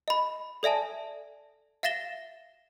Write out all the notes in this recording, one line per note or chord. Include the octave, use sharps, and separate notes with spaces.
D#5 B5
A4 D5 E5 G#5 A5
E5 F5 A6 A#6 E7 G7